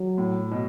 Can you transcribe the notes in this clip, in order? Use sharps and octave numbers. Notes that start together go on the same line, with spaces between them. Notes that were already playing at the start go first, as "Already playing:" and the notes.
Already playing: F#3
A2
B2